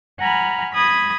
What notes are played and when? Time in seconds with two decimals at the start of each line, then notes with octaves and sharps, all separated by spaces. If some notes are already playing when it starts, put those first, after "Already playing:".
0.20 F#5 G#5 A#5 B5 F6
0.73 B5 D#6 G#6 A#6